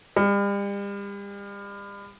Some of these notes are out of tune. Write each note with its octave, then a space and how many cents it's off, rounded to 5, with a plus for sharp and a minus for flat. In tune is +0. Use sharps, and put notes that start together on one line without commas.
G3 +40